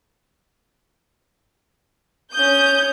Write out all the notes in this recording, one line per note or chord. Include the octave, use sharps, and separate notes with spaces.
C#4 D#6 G6